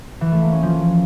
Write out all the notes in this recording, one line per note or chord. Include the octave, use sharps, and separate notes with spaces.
E3
A3
A#3
C#4
F3